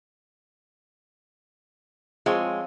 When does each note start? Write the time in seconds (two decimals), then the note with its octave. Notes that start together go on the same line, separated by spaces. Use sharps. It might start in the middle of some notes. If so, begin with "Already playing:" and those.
2.26 F3 G#3 C4 C#5